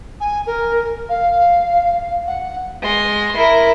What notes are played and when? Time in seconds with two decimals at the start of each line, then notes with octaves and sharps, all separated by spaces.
0.20 G#5
0.46 A#4
1.09 F5
2.27 F#5
2.82 G#3 C6
3.36 E4 A#4